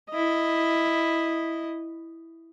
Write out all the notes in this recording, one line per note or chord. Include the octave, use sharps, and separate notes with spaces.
E4 D#5